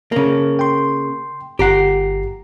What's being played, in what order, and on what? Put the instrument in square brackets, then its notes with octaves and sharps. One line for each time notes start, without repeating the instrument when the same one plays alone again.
[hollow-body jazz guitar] C#3 A#3
[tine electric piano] G5 C6
[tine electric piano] G1 A#5 C7 [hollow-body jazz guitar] G4 F#5